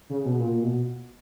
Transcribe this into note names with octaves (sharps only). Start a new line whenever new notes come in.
C#3
B2
A#2
B2